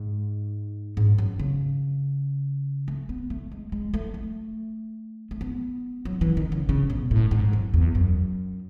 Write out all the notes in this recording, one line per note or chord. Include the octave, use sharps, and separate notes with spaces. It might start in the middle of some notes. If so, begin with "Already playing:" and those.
Already playing: G#2
G#2
F#2
C#3
A3
B3
A3
G#3
G#3
A3
A3
A3
B3
F#3
E3
D#3
C#3
C#3
B2
A2
G#2
F#2
E2
F#2